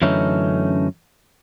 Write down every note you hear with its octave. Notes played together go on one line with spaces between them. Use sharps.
F#2 D3 E3 A3 C#4 D#4